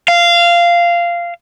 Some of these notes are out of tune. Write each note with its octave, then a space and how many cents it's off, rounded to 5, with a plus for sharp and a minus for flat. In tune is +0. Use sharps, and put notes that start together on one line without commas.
F5 -15